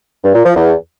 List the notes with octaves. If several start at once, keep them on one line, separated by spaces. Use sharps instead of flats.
G2
A#2
F3
E2